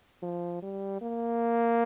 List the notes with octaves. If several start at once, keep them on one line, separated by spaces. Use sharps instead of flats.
F3
G3
A#3